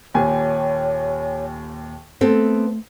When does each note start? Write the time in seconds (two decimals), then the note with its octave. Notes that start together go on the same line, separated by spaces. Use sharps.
0.14 D#1 D#2 C#5 G#5
2.21 A3 B3 C4 A4